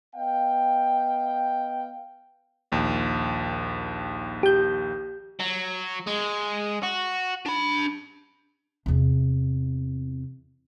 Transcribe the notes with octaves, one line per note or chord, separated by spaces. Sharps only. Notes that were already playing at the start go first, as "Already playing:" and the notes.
B3 D#5 F5 G5
A#1 D#2
G4 G6
F#3
G#3
F#4
D4 B5
E2 C3